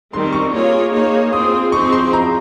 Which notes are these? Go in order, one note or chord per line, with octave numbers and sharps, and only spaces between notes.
D#3 G3 C4 C6
C#6
A#3 F4 G#4 C#5
A#3 D#4 G#4 C#5
C4 F4 G#4 C5 D#6
F3 C4 D#4 G#4 C5 C#6
C6
A#5